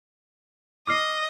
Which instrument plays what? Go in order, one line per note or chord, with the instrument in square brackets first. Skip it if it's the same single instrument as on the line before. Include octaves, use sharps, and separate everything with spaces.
[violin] D#5 [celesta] D6 F6 C7